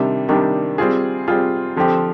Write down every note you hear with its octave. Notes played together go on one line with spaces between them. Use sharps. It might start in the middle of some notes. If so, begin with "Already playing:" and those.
Already playing: C3 D#3 G3 D4
C3 D#3 G3 D4
G3 C4 F4 G#4
G3 C4 F4 G#4
D3 F3 C4 G4